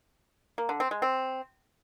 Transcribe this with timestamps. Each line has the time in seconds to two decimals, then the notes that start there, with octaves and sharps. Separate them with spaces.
0.58 A#3
0.69 D3
0.80 C4
0.91 G#3
1.02 C4